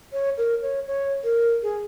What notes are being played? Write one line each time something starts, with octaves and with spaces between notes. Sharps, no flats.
C#5
A#4
C#5
C#5
A#4
G#4